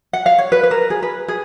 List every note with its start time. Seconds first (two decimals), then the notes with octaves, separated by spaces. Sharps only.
0.13 F#5
0.26 F5
0.38 C#5
0.52 B4
0.63 B4
0.71 A#4
0.90 G#4
1.02 B4
1.28 G#4